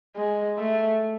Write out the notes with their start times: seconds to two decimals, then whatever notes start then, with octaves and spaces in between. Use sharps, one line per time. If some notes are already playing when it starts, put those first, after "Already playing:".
0.16 G#3
0.58 A3